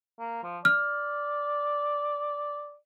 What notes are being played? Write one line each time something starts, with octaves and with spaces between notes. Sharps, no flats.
A#3
F3
D5 F6